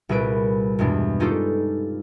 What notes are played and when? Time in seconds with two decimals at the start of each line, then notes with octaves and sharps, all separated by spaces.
0.09 C2 A#2 G#4 B4 D7
0.79 E2 G2 B2 G#3 D4
1.20 C#4 D#4 F4 G4 A4 D5